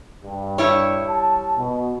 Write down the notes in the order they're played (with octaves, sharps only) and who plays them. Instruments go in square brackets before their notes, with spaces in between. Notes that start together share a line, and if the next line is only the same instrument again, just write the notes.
[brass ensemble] G2
[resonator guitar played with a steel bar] G3 E4 C#5
[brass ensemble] A5
B2